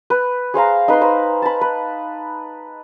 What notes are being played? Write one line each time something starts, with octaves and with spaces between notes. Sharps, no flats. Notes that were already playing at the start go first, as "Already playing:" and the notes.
B4
G#4 C5 F5 A#5
D#4 B4 F5 C6
D#4 B4 C5
A5 B5
B4